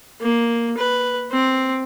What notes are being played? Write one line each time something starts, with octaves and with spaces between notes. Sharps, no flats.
A#3
B4
C4